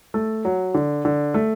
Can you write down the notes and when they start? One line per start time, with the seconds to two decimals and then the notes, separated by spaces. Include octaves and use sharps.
0.14 A3
0.45 F#3
0.74 D3
1.05 D3
1.34 A3